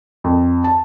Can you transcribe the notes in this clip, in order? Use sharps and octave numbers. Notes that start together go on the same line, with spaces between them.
F2
A5